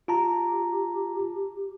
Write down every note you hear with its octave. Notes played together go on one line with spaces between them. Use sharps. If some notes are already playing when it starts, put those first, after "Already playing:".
F4 G4 A5 A#5